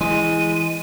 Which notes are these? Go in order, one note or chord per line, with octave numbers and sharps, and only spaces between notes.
E3 G#3 D#7